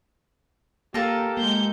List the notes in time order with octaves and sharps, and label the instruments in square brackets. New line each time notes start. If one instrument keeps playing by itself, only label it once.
[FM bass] A#3 [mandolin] F4 A4 A#4 [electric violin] G4
[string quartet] G#3 G6 [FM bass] A#3